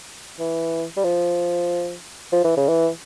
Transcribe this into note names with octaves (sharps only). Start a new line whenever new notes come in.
E3
G3
F3
F3
E3
C#3
E3